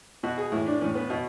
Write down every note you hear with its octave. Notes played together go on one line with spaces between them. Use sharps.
B2 F#4
G#4
A2 E3 E4
D4
A2 E3 C#4
B3
B2